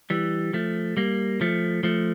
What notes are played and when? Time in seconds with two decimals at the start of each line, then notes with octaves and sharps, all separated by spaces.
0.10 E3 G3
0.53 F3 A3
0.97 G3 A#3
1.41 F3 A3
1.83 F3 A3